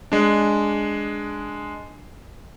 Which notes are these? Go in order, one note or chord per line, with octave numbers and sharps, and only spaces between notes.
G#3 D4